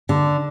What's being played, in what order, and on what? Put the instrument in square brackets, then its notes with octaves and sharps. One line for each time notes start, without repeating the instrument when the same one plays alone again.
[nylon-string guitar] D3